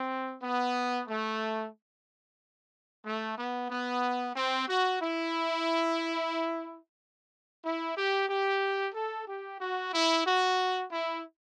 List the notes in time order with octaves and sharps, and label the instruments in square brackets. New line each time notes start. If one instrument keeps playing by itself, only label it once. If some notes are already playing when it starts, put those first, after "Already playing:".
Already playing: [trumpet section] C4
B3
A3
A3
B3
B3
C4
F#4
E4
E4
G4
G4
A4
G4
F#4
E4
F#4
E4